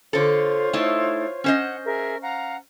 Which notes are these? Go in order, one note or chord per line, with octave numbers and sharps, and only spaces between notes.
D3 F4 A4 C5 C#5
A3 D#4 E4
C#4 C5 D#5 F#5
G#4 A#4 E5
F5 F#5 A#5